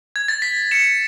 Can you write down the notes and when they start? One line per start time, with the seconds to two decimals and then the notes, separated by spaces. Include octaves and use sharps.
0.16 G#6
0.28 A6
0.42 B6
0.71 C#7 E7